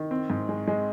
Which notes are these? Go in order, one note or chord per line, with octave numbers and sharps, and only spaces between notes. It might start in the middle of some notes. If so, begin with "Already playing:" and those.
Already playing: D#3
C4
G#2
G#3
G#3